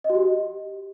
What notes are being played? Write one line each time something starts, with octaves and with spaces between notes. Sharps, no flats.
D#5
F#4
G4